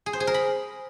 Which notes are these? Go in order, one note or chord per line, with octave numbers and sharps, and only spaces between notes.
G#4
C5
G#4
A#4
B5